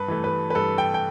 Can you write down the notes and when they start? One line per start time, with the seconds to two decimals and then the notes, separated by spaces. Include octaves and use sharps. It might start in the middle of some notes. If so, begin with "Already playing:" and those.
Already playing: G2 B4
0.08 E3 A3
0.24 B4
0.50 B4
0.55 G2 A4
0.78 G5
0.94 G5